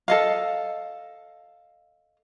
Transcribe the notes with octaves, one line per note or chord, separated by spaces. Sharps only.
A4 D#5 F5